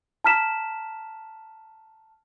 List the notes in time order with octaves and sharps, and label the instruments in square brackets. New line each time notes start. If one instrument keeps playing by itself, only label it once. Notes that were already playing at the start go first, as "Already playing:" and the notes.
[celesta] A5 A#5 F6 B6 E7